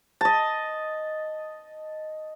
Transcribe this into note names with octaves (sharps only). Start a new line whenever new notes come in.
D#5 A5